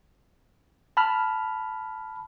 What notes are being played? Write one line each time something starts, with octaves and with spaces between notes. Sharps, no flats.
A5 B5 F6